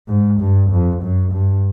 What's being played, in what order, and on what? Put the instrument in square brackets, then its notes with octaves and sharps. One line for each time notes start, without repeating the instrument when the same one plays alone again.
[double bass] G#2
G2
F2
F#2
G2